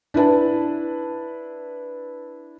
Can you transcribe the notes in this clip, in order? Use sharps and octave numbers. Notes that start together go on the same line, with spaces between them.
D4 E4 B4 A5